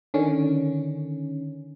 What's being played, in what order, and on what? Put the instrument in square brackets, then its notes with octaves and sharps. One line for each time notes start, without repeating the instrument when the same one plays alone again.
[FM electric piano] D3 D#3 C#4